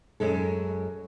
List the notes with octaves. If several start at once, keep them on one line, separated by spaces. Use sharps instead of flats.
F#2 G#3 A4